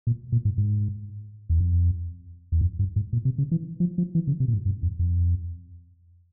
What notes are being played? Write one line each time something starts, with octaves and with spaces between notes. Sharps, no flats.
A#2
A#2
G#2
G#2
E2
F2
E2
F2
G2
G#2
A#2
C3
C#3
E3
F3
F3
E3
C#3
C3
A#2
G#2
G2
F2
F2